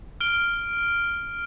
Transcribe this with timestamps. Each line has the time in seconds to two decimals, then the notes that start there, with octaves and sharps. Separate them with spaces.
0.20 F6 D7 G7